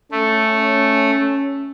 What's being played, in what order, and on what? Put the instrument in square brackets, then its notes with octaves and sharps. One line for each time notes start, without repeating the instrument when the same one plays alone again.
[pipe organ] A3 [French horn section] C#4